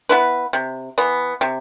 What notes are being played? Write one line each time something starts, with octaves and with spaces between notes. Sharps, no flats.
B3 E4 B4
C3
E3 B3
C3